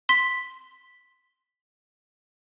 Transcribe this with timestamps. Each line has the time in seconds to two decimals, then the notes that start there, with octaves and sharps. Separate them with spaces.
0.09 C6 B6